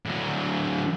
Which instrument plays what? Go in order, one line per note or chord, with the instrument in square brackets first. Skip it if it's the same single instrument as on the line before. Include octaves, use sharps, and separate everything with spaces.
[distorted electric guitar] D3 F#3